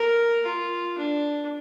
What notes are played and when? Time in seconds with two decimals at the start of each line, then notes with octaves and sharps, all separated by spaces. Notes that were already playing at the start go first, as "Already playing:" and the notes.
Already playing: A#4
0.45 F4
0.98 D4